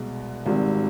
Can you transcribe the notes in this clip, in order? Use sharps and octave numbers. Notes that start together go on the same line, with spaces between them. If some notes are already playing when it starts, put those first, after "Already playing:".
Already playing: C2 B2 G#3
G#1 G#2 G3 C4